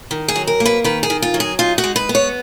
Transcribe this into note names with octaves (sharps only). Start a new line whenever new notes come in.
D#3
G#4
F#3
A#4
A#3
B4
D#3 B4
G#4
D#3
F4
F#3
G#4
D#4 F4
F#4
G#3
B4
B3
C#5